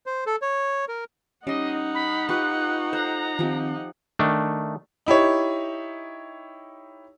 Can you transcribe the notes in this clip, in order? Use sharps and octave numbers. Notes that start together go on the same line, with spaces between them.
C5
A4
C#5
A#4
G3 C#4 D#4 D#5 F#5 C6
B5
F4 G4 B4 B5 C#6 F#6
A4 C5 A#5 F#6
D#3 F3 C4 G4
D#3 A3 D4
D#4 E4 G4 C#5